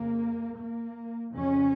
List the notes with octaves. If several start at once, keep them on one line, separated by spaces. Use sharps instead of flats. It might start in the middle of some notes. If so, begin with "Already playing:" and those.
Already playing: F2 C#3 A#3
A#3
F2 C#3 C#4